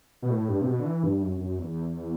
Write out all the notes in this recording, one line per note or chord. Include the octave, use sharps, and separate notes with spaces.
B2
A2
G2
C3
B2
D3
E3
G2
F#2
F#2
E2